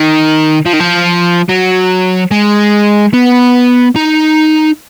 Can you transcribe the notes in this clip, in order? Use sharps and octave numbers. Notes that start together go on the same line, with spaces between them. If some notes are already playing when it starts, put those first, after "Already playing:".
Already playing: D#3
F3
D#3
F3
F#3
G#3
B3
D#4